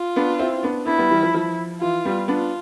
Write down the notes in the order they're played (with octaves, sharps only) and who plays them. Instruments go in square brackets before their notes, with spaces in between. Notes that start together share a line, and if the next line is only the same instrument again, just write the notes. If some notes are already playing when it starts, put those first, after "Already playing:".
Already playing: [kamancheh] F4
[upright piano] B3 D4
C4 E4
B3 D4
[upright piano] B3 D4 [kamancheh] E4
[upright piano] G3 B3
E3 G3
F3
F3
[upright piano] E3 [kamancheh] F4
[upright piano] G3 B3
[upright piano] B3 D4 [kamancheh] F4